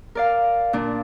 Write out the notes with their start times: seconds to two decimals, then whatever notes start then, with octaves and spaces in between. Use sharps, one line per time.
0.15 A#4 D5 F5
0.73 A#2 D4